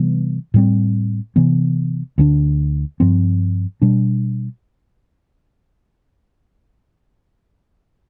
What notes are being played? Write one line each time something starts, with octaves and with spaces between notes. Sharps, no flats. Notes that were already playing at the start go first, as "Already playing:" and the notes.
Already playing: C3 E3 G3 B3
A2 G3 C4
C3 E3 B3
D2 D3 A3 D4
G2 F3 C4
B2 G3 D4